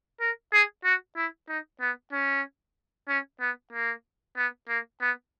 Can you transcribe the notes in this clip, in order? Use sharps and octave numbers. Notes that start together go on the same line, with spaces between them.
A#4
G#4
F#4
E4
D#4
B3
C#4
C#4
B3
A#3
B3
A#3
B3